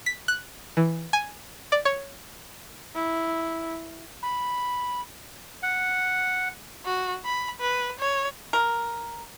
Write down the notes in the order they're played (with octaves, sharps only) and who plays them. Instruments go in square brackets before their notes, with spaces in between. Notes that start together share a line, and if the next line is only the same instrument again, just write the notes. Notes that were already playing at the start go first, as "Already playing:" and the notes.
[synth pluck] B6
F#6
E3
G#5
D5
C#5
[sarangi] E4
[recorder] B5
[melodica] F#5
[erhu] F#4
B5
B4
C#5
[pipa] A#4